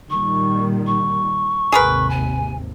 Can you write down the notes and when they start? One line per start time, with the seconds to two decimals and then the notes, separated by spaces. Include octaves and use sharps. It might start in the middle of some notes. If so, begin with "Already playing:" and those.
0.10 A#2 D#3 G3 C#6
0.87 C#6
1.72 G#1 D#2 C3 G#4 A#4 B4
2.10 G#5